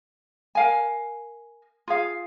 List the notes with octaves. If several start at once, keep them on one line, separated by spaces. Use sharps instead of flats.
A#4 F5 G#5
F4 G#4 F5